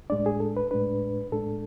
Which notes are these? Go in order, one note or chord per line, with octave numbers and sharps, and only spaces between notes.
A2 G#3 D4 D5
G#4
A4
B4
A2 G#3 D4 B4
A2 G#3 D4 A4